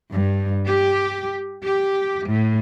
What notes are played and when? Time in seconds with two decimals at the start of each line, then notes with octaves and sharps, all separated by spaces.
0.12 G2
0.67 G4
1.65 G4
2.28 A2